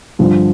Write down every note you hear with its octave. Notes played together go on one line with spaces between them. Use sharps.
G2 D3 F3